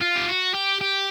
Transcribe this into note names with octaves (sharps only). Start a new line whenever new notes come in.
F4
G4
F#4
G4
G4